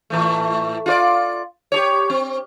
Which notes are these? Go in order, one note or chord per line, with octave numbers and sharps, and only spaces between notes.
A2 E3 A3
F4 F#4 D5
G4 G#4 C#5
C4